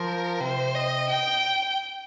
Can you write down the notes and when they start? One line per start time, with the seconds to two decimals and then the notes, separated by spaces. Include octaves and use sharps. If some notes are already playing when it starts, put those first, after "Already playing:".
Already playing: F3 A#4
0.41 C3 C5
0.75 D#5
1.10 G5